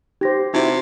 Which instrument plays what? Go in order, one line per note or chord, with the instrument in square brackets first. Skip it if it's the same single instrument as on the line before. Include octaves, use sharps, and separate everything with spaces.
[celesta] D#4 A#6 [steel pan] G4 C5
[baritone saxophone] C3 [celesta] D#4 E5 [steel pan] E4 F#4